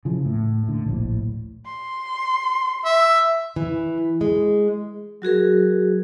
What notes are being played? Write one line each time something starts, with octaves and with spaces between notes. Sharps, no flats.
C#3 E3 F3
A2
A2 D3
D1 A#1 A2
C6
E5
E3
G#3
F#3 F#4 G#4 A#4